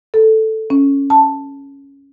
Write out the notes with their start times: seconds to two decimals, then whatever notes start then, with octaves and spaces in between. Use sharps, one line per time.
0.14 A4
0.70 C#4
1.10 A5